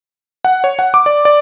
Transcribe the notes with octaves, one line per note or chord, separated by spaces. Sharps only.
F#5
C#5
F#5
D6
D5
D5